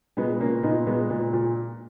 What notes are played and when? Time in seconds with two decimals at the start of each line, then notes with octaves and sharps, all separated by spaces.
0.17 A#2 G#3 B3
0.40 A#2 A#3 C#4
0.63 A#2 B3 D#4
0.87 A#2 G#3 B3
1.10 A#2
1.33 A#2